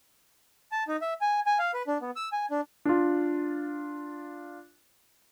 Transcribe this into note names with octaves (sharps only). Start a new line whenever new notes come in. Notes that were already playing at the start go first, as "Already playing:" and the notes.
A5
D#4
E5
G#5
G#5
F5
B4
D4
B3
E6
G#5
D4
D4 F4